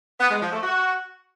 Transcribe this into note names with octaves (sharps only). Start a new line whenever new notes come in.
B3
G#3
F3
A3
F#4